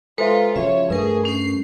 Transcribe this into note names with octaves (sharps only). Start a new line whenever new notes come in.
G#3 F4 A4 B4 C5 E5 A#5
C#3 F3 F#4 C#5 E5
G2 A3 G#4 A#4 B4 C#6
C#4 C7